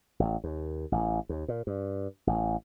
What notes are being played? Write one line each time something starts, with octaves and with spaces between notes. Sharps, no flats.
A1
D#2
A1
D#2
A#2
G2
A1